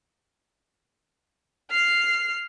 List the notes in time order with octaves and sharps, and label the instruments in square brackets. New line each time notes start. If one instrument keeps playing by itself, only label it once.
[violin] F6 C7